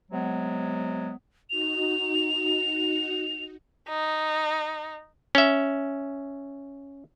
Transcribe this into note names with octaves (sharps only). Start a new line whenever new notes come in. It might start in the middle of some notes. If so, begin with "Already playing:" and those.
C3 F#3 G#3 B3
D#4 F#4 F7
D#4
C#4 E5